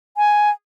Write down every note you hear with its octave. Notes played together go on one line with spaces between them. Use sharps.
G#5